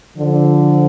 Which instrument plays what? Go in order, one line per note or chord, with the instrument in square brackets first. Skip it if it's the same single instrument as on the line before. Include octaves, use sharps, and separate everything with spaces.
[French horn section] D3 F3